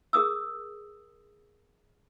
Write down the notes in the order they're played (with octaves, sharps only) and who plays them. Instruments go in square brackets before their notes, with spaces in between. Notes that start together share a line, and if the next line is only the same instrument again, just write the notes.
[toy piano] G#4 A#4 D#6 E6